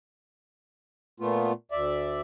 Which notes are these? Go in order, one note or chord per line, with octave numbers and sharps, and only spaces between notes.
A#2 A3 B3 F4
D2 D5 E5